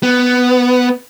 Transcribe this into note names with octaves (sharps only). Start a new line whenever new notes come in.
B3